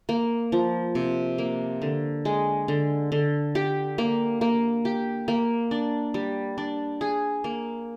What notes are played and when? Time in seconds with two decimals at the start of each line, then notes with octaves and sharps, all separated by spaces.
0.09 A#3
0.52 F3
0.95 C3
1.38 A#3
1.82 D3
2.25 G#3
2.68 D3
3.12 D3
3.55 G4
3.98 A#3
4.41 A#3
4.85 G4
5.28 A#3
5.71 D4
6.14 G3
6.58 D4
7.01 G#4
7.44 A#3